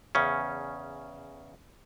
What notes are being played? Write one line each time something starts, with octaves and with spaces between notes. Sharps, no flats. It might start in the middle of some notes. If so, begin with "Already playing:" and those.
E2 C#3 C#4